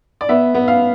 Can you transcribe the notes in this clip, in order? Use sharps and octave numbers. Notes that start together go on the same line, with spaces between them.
D5
B3 E5
B3
F5